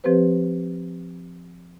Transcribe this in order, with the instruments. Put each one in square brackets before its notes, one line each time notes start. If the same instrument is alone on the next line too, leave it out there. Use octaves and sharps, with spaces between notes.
[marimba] F3 C4 G4 B4 C5